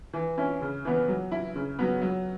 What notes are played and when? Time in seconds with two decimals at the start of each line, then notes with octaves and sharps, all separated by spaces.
0.13 E3
0.37 C#4 E4
0.62 C#3
0.85 E3 B3
1.08 F#3
1.32 E4
1.55 C#3
1.79 F#3 B3
2.02 F#3